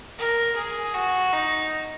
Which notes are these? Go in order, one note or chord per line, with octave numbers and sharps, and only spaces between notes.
A#4
G#4
F#4
D#4